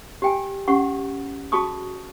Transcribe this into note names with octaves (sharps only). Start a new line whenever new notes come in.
G4 G5 G#5
C#4 G4 F#5 C#6
F#4 G#4 A5 C#6 D#6